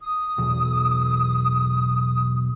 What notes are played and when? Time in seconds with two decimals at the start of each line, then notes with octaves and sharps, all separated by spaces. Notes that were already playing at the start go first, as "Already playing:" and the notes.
0.01 D#6
0.38 B1 E2